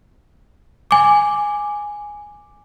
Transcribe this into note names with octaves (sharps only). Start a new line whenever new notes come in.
G#5 D6